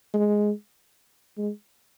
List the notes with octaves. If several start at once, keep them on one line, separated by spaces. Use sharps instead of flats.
G#3
G#3